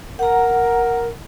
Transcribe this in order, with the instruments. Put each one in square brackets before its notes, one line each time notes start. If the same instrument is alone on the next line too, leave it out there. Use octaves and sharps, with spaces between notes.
[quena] A#4 [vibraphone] F#5 A#5